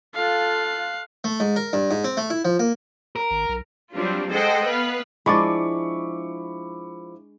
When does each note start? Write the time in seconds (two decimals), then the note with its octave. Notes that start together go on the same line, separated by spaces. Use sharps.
0.15 F4 A4 F5 F#6
1.24 A3
1.40 G#2
1.56 A#4
1.73 G2
1.91 G#2
2.04 C4
2.17 A3
2.30 E4
2.45 F3
2.59 A#3
3.16 A#4
3.31 G#1
3.49 B1
3.93 F#3 G3 C4 D4 F4
4.29 G#3 A4 C5 D#5 F#5 G5
4.66 B3 B4 F5
5.26 F3 G#3 D4 E4 D5 B5 C#6 D6